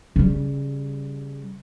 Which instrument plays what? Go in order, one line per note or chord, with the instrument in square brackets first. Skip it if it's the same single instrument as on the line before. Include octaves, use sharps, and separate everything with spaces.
[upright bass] C#3 G3